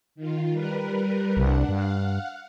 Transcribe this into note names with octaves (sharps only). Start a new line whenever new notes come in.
D#3 F4
G3 A#4 B4
C2 D4 F#5
G2 F5 F#5